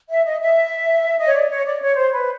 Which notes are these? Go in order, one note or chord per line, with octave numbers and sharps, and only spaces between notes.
E5
D#5
E5
D#5
C#5
D5
C#5
D5
C#5
C5
B4